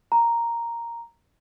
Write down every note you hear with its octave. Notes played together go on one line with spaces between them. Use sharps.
A#5